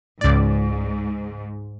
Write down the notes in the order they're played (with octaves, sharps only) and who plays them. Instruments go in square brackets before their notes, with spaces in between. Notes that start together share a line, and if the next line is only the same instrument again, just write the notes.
[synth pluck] C#2 D5 [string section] G#2